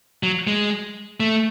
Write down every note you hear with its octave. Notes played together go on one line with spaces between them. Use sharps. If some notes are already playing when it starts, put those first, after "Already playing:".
F#3
G#3
A3